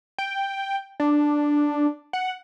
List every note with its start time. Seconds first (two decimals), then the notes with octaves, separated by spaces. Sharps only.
0.18 G5
1.00 D4
2.13 F#5